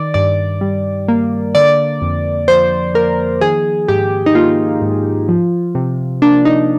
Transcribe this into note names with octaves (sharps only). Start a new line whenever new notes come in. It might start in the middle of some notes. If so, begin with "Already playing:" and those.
Already playing: D#3 D5
G2 D5
G3
A#3
D3 D5
F2
F3 C5
A#3 A#4
D#3 G#4
G#2 G4
D#4
A#3 F4
G#2
F3
C3
A#3 D4
D#4